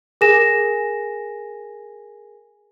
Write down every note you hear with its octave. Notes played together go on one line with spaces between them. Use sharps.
G#4 A#4 G#5 A#6 E7